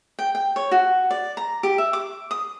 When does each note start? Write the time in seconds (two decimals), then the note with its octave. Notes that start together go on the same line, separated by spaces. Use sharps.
0.19 G5
0.35 G5
0.56 C#5
0.71 F#4
1.11 D5
1.37 A#5
1.63 G4
1.78 E5
1.93 D6
2.31 D#6